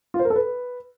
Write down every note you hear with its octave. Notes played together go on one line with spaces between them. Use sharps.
F4
C5
A#4
A4
B4